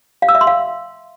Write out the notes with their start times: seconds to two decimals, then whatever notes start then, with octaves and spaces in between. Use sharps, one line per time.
0.22 F5
0.29 E6
0.35 E5
0.41 C6
0.47 F5